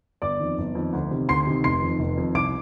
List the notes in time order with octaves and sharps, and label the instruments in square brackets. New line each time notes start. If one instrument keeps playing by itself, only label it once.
[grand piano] G1 D5 D6
F2 D#3
G1
F2 D#3
D2
C3 D#3
D2 C6 C7
C3 D#3
F1 C6 C7
F2 D#3
F1
F2 D#3
C2 D6 D7